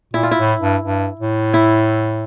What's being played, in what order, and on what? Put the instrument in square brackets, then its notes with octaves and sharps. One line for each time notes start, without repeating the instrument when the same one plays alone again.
[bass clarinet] A#2 [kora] E4
[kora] F4
E4
[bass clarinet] A2
G2
G2
A2
[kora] E4